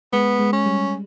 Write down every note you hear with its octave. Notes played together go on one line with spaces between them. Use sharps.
G#3 B3
G#3
C#4
G3